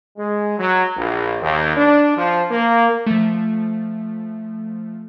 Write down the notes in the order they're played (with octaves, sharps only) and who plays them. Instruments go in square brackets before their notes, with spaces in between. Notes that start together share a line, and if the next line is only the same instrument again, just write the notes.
[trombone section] G#3
F#3
A#1
D#2
D4
F3
A#3
[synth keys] F3 A3